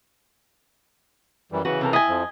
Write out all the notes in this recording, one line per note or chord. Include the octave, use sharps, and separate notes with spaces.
F#2 E3 G3
C#3 E3 F#4 B4
C3 A4 A#4
E4 D#5 G#5
F2 F3